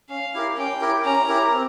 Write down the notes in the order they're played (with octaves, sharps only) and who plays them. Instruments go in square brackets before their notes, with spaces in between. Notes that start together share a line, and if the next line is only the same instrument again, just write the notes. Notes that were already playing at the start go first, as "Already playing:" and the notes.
[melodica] C#4 [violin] F5
[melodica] E4 G4 A#4
[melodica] C#4 [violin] G5
[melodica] E4 G4 A#4
[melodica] C#4 [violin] A#5
[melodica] E4 G4 A#4
C4